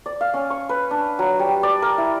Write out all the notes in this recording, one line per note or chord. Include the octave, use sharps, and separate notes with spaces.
D5
F5
C#4
C#6
B4
D4
F#3
G3
D5
A#4
E4